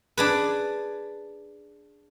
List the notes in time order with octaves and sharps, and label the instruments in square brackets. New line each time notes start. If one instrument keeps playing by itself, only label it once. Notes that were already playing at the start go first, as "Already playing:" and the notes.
[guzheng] D4 G#4 B4